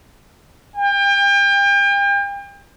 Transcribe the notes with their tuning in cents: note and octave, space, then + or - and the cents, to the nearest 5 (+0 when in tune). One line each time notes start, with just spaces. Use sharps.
G5 +35